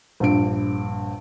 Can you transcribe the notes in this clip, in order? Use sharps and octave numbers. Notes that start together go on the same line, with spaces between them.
A#1 G2 D7